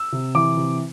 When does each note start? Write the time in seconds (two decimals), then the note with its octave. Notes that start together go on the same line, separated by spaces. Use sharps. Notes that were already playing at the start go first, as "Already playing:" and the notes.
Already playing: E6
0.12 C3
0.35 E3 D6
0.57 C3